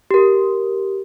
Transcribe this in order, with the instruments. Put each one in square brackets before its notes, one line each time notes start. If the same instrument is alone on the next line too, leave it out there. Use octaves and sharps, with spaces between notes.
[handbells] G4 A#4